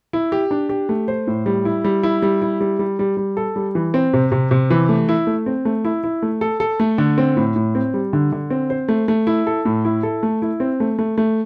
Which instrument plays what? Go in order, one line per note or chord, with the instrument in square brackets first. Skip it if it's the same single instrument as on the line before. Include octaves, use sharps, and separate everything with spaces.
[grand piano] E4
G4
D4
G4
A3
C5
A2
G3
E4
G3
E4
G3
E4
G3
G3
G3
G3
A4
G3
E3
C4
C3
C3
C3
E3
A3
E4
A3
C4
A3
E4
E4
A3
A4
A4
A3
D3
C4
A2
A2
C4
G3
D3
D3
C4
C5
A3
A3
E4
A4
A2
E4
A4
A3
E4
C4
A3
A3
A3